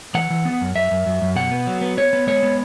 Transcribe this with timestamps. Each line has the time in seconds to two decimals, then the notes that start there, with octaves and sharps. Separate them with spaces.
0.15 E3 F#5
0.30 E3
0.45 B3
0.61 F#2
0.76 F#2 E5
0.91 F#2
1.06 F#2
1.22 F#2
1.36 B2 F#5
1.51 B3
1.67 F#3
1.81 B3
1.97 B3 C#5
2.13 B3
2.27 G#3 C#5
2.43 B3